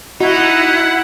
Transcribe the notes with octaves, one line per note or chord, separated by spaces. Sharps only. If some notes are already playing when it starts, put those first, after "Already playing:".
D#4 E4 F#4 F#5